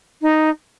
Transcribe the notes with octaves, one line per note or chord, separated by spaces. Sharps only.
D#4